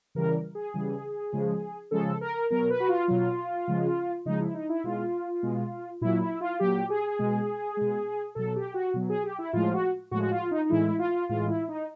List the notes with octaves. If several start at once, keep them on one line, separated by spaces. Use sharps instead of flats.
C#3 E3 G3 A#4
G#4
C#3 E3 G3
C#3 F3 G#3
C#3 F3 G#3 A4
A#4
B2 F#3 A#4
B4
F#4
F4
B2 F#3
C#3 F3 G#3
C#3 F3 G#3 D#4
E4
D#4
E4
B2 G#3 F4
B2 G#3
A#2 F#3 E4
E4
F4
A#2 F#3 G4
G#4
B2 G#3
B2 G#3
B2 F#3 A4
G4
F#4
B2 F#3
G#4
G4
E4
A2 F3 G#3 F4
F#4
A2 F3 G#3 F#4
F#4
F4
D#4
D#4
A2 E3 G#3 E4
F4
A2 E3 G#3 F4
E4
D#4